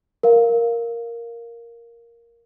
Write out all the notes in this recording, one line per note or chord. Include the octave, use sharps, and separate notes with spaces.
A#4 F5